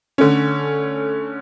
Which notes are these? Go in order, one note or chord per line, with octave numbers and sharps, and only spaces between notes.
D3 A3 C#4